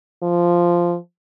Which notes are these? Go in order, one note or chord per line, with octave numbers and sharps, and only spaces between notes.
F3